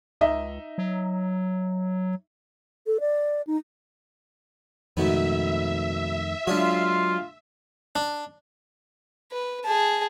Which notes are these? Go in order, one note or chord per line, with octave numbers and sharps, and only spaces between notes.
C#2 D#4 D#5 E5
F#3
A4
D5
D#4
F2 G#2 B2 D#3 A3 B3 E5
F#3 G#3 D4 F4 G#4
D4
B4
G#4 A5